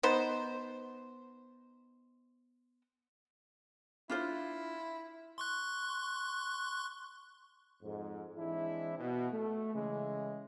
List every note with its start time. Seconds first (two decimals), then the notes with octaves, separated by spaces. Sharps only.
0.03 B3 D#4 C5
4.10 D4 E4 F4 C5
5.38 C6 C#6 F#6
7.83 F2 G#2
8.36 E3 G#3 C4 D4 E4
8.98 B2
9.33 A3
9.74 C#3 E3 G#3